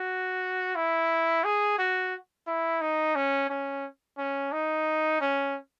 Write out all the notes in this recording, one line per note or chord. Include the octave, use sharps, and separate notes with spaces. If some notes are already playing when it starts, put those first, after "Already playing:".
Already playing: F#4
E4
G#4
F#4
E4
D#4
C#4
C#4
C#4
D#4
C#4